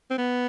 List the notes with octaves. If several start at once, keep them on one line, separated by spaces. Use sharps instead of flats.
C4
B3